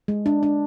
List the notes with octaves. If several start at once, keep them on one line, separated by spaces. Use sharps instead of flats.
G#3
D4
D4